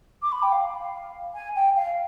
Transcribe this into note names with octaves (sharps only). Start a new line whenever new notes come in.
D6
B5
G5
F5
G#5
G5
F5